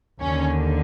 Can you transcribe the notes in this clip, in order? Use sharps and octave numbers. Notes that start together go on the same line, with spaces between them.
D#2 D3 C#4